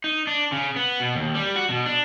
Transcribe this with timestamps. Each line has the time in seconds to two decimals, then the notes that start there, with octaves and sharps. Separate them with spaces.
0.04 D#4
0.27 D4
0.52 C#3
0.76 B3
1.00 B2
1.15 D#2
1.35 G3
1.56 F#4
1.70 B2
1.86 D4